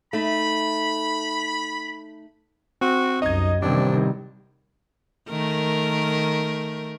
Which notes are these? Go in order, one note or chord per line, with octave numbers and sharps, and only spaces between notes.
A3 D#4 B5
C4 F#4
C2 F#2 D#4 D#5 G#6
A1 C3 D#3 G3 C4 D4
D#3 A3 A#4